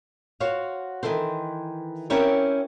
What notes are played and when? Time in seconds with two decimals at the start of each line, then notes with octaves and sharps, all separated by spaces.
0.40 F#4 C5 C#5 F5
1.03 D#3 E3 E4 A4 C5
2.10 C4 C#4 E4 G4 A#4 C#5